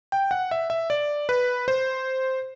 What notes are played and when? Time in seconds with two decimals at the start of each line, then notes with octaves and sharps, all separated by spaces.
0.12 G5
0.31 F#5
0.51 E5
0.70 E5
0.90 D5
1.29 B4
1.68 C5